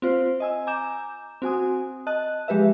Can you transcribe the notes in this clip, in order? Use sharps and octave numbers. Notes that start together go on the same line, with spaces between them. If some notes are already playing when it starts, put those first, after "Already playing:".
C4 F4 C5
D#5 G#5 E6
G#5 A#5 D6 G6 E7
C4 F#4 G#5 D#6
D#5 A5 F#6
F3 G#3 G4 B4 E5